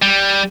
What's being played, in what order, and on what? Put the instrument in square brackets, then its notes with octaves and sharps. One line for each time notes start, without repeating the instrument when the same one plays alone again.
[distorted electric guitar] G3